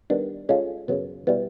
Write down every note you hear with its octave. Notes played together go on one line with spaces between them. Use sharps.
D#3 G3 B3 D4
G#3 C#4 F4 A4
F#2 C#3 F#3 B3
B2 G3 B3 E4